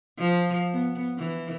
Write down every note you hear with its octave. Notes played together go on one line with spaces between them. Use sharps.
F3
B3
E3